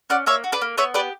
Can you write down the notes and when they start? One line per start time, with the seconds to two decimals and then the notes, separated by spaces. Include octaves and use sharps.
0.10 C#4 D5 F#5
0.26 A#3 C#5 E5
0.44 F#4
0.52 B4 D5
0.61 A#3
0.78 B3 C#5 E5
0.94 G4 B4 D5